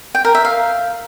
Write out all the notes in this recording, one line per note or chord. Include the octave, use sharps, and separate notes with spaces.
G5
A#4
E5
F5